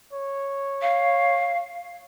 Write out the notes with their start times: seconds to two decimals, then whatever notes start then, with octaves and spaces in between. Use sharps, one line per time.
0.13 C#5
0.82 F5